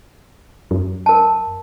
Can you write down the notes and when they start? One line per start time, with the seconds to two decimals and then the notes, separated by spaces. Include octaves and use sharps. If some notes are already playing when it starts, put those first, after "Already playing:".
0.71 F#2
1.06 A#4 A5